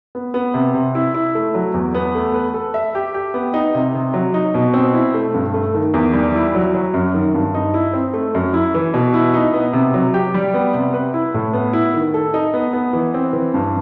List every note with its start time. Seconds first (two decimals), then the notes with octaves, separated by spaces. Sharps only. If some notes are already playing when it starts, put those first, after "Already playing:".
0.15 B3
0.34 B3
0.54 C3
0.74 C3
0.95 E4
1.14 E4
1.35 A3
1.54 F#3
1.74 E2
1.94 B3
2.15 A3
2.34 B4
2.54 A4
2.74 E5
2.95 G4
3.14 G4
3.34 B3
3.54 D#4
3.75 C3
3.95 C3
4.14 F#3
4.34 D#4
4.54 B2
4.74 C4
4.94 E4
5.14 A3
5.34 G2
5.54 A3
5.74 D#3
5.94 E2
6.13 G3
6.35 E4
6.55 F#3
6.75 F#3
6.94 F#2
7.14 D#3
7.34 G2
7.54 D#4
7.74 E4
7.93 C4
8.14 A3
8.35 F#2
8.54 E4
8.74 E3
8.94 B2
9.14 E4
9.34 D#4
9.54 B3
9.73 C3
9.94 F#3
10.14 G4
10.34 G3
10.54 B3
10.74 C3
10.94 B4
11.14 E4
11.34 A2
11.53 B3
11.73 E4
11.94 D#3
12.14 A4
12.34 D#4
12.54 B3
12.73 B3
12.93 E3
13.14 C4
13.33 E3
13.54 G2